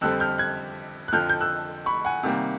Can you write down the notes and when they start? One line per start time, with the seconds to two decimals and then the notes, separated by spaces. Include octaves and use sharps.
0.01 F2 D3 G3 C4 E6 F#6
0.20 F6 G6
0.38 F#6 G#6
1.08 F#6
1.12 F2 D3 F3 F6 G6
1.29 G6
1.41 E6 F#6
1.86 B5 C#6
2.05 F#5 G#5
2.23 C3 D#3 G3 A#3